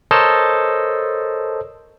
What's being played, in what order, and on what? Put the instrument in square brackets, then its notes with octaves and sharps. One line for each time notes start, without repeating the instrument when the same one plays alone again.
[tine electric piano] A4 A#4 C5 C#5 D#5 A5